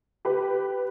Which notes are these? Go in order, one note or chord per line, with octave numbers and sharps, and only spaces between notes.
G4 B4